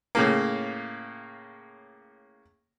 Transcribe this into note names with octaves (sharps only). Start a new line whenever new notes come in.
A2 C#3 A#3